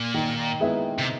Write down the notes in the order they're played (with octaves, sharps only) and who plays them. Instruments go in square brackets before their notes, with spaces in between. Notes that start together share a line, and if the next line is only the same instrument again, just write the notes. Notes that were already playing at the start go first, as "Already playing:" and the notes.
Already playing: [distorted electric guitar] A#2
[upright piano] D#3
G#3 B3 E4
[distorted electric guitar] C3